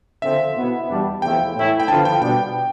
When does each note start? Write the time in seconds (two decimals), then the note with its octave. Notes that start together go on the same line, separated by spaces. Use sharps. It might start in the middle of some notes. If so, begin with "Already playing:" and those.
0.22 D3 F3 C4 E5
0.56 B2 B3 E4
0.89 E2 B2 G3 D4
1.22 E2 C3 F3 A3 E4 G5
1.55 A2 E3 A3 E4
1.80 G5
1.88 D3 F3 B3 F4 A5
2.05 G5
2.21 B2 G3 B3 D4 G5